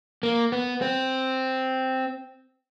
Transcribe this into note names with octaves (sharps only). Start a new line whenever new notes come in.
A#3
B3
C4